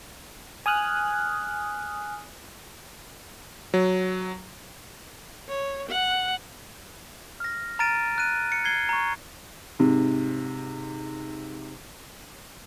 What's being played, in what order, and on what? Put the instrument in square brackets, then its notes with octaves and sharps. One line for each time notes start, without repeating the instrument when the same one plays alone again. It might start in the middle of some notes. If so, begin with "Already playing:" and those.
[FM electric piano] G#5 D#6 F6 F#6
[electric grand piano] F#3
[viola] C#5
F#5
[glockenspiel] F6 A#6
A#5 F6 A6 D7 D#7
F#6 D#7
C#7
G#6 C7 G7
A#5 C#6
[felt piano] G#2 C3